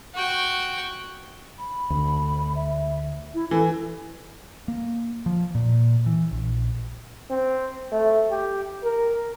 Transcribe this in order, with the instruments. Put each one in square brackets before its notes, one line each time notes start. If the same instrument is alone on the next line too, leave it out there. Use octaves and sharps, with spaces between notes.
[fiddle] F#4 G5
[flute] B5
[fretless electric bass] D2
[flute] E5
E4
[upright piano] E3 [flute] A4
[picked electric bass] A#3
F3
A#2
E3
A#1
[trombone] C4
A3
G4
A#4